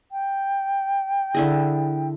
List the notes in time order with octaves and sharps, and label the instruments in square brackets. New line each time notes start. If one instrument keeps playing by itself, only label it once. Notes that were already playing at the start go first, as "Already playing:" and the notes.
[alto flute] G5
[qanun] D3 E4 G#4